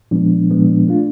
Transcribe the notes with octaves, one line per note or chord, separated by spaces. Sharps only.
A#2 F3 G#3 B3 D4
A#2 F3 G#3 B3 D4
A3 D4 F4